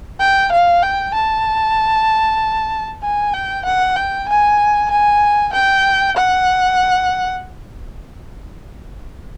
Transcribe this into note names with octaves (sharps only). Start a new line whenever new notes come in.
G5
F5
G5
A5
G#5
G5
F#5
G5
G#5
G#5
G5
F#5